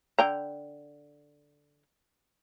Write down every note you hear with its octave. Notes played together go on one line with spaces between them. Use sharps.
D3 G5 A#5